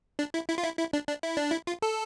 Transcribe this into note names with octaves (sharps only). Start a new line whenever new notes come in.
D4
E4
E4
F4
E4
E4
D4
D4
E4
D4
E4
F4
A4